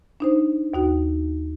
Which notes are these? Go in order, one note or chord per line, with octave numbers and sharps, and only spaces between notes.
D4 D#4 C5
D#2 D#4 F#4